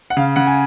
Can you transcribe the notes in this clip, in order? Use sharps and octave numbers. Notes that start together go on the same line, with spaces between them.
F#5
C#3 F5
C#3 F#5
G#5